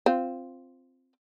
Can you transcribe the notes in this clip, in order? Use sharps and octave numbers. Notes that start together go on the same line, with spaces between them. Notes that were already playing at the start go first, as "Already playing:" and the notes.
C4 F4